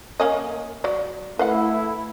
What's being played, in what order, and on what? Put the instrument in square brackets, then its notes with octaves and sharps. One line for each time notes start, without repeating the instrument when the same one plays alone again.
[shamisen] A#3 C#4 D#5
F#3 D5
[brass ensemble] A3 E4 [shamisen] B4 F5 F#5